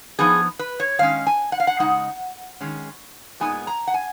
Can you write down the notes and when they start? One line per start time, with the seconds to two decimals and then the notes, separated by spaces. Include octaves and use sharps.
0.19 F3 B3 D#4 G#4
0.59 B4
0.80 C#5
0.99 D#3 G#3 C#4 F5
1.27 G#5
1.52 F#5
1.60 F5
1.67 F#5
1.79 C#3 G#3 D#4 F#5
2.61 D#3 G#3 C#4
3.40 A#2 G#3 B3 D#4 G#5
3.67 A#5
3.87 F#5
3.94 G#5